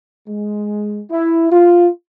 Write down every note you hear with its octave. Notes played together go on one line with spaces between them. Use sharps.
G#3
E4
F4